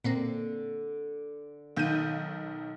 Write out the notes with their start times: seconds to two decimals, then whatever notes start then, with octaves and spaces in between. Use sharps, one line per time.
0.04 A#2 D3 A#3 C4
1.77 B1 D#3 F5 G6 D#7